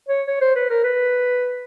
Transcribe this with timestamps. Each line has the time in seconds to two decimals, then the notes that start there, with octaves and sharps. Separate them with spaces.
0.08 C#5
0.27 C#5
0.41 C5
0.55 B4
0.70 A#4
0.83 B4